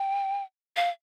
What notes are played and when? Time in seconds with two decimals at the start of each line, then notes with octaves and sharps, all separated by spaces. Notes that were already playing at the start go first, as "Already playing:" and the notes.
Already playing: G5
0.76 F5